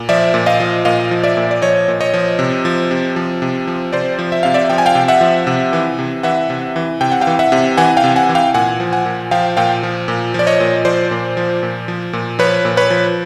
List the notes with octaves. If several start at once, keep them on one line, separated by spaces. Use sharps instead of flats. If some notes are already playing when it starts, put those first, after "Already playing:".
Already playing: A#2
F3 D5 E5
A#2
D#5 F5
F3
A#2 D#5 F5
F3
D5 E5
A#2
D5
F3 C#5 D#5
A#2
C#5 D#5
F3
C3
F3
C3
F3
C3
F3
C3 C5 D5
F3
E5
C3 F5
D5 E5
F3 G5
G#5
F5 G5
C3
E5 F#5
F3
C3
E3
C3
E3 E5 F#5
C3
E3
C3 G5
F#5
F5 G5
E3
E5 F#5
C3
E3 F#5 G#5
F5 G5
C3
F#5 G#5
E3
F5 G5
A#2 F#5 G#5
F3
F#5 G#5
A#2
F3 F5 G5
A#2 F5 G5
F3
A#2
F3 D5
C#5 D#5
A#2
F3 C5 D5
A#2
F3
A#2
F3
A#2
F3 B4 C#5
A#2
B4 C#5
F3